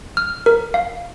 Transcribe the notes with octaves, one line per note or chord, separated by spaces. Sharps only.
F6
A#4
F5